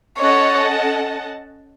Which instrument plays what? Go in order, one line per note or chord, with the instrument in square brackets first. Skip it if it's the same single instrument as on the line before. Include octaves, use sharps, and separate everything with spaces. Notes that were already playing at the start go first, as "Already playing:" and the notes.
[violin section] C#4 A4 D#5 F#5 A5 [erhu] C#5